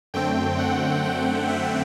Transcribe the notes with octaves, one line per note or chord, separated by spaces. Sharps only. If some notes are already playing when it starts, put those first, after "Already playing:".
F#2 D3 A3 C4 G5
F#5
F#5
E5